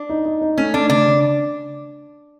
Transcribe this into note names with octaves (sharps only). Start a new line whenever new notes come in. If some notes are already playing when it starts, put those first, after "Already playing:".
Already playing: D4
D#4
D#4
D#4
A3 C#4
A3 D4
C#3 D4
C#3